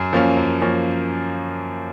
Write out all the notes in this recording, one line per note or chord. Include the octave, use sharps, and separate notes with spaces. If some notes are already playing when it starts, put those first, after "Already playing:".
Already playing: F#2
F3 A#3 C#4
F#2
F3 A#3 C#4